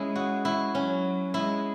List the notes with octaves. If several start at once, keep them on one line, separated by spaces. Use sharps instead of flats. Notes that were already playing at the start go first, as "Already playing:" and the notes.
Already playing: G#3 C#4 E4
F#4
E4
F#3 C#4
G#3 E4